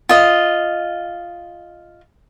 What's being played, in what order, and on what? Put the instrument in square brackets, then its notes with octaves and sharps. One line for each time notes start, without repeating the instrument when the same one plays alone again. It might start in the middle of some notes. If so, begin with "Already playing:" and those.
[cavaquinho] F4 D#5